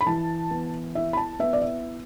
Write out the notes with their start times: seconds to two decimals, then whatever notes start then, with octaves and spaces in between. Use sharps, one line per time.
0.01 B5
0.06 E3 A5
0.51 B3
0.95 E4 E5
1.13 B5
1.17 A5
1.39 B3 E5
1.53 D5
1.62 E5